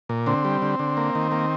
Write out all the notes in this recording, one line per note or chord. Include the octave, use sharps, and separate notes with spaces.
A#2
D3 C4
G3
D3
D3
A#3
D#3
A#3